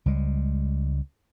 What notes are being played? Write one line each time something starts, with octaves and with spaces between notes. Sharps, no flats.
C#2 G3 G#3